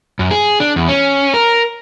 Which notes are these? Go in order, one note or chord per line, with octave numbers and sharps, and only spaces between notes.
F#2
G#4
D4
E2
C#4
A#4